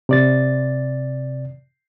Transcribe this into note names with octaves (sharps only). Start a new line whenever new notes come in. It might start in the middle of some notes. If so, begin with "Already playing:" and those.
C3 D5 A6